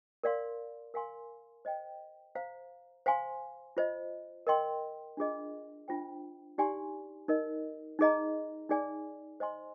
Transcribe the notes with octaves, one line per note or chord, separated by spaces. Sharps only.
A#4 D5 F5 C6
A#4 F5 G#5 C6
C5 D#5 G5
C5 F5 A#5
C5 F5 G#5 C6
F4 C5 D#5
A#4 D#5 G5 C6
D4 F4 G#4 D#5
D4 F4 C5 G5
D#4 G4 D5 G#5 C6
D#4 A#4 D#5
D#4 G#4 D#5 A#5
D#4 G#4 D5 G#5
C5 D#5 G#5 C6